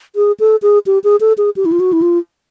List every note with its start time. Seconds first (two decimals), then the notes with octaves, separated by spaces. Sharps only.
0.16 G#4
0.40 A4
0.62 G#4
0.86 G4
1.04 G#4
1.20 A4
1.38 G#4
1.56 G4
1.65 E4
1.72 F4
1.80 F#4
1.93 E4
2.02 F4